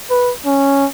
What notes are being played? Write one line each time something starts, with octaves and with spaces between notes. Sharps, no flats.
B4
C#4